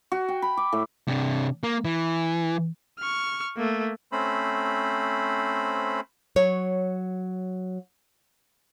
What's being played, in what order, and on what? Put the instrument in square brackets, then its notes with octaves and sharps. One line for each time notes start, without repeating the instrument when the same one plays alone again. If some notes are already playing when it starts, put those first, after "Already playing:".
[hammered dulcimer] F#4
G5
B5
D6
A2
[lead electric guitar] C3 D4
A#3
E3
[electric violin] C#6 F6
A3 A#3
[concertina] A3 C4 C#4 C5 B5
[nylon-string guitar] F#3 C#5